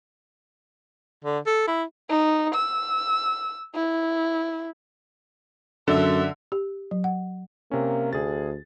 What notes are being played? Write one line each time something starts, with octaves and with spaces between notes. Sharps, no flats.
D3
A4
E4
D#4
E6
E4
F#2 D3 A4 E5
G4
F#3
F#5
C3 A#3 C#4
D2 G#4 A6